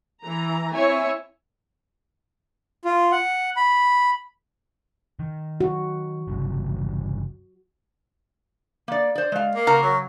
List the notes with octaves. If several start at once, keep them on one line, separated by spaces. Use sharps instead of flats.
E3 A#5
C4 E4 C#5 E5 G#5
F4
F#5
B5
D#3
F#4
G1 C2 C#3
A#3 D5
C5 D5
G#3 F5
A#3
C#3 F#4 A#4
F#3